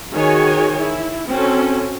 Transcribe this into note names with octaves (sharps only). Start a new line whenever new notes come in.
D#3 F#4 G#4 C#5 G#5
E4
C4 C#4 F#4 A4